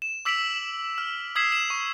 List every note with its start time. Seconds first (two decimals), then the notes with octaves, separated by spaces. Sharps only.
0.02 E7
0.25 D6 E6 B6 D7 F7 F#7
0.98 F6
1.36 D#6 E6 G#6 B6 C7 E7
1.52 E7
1.70 C#6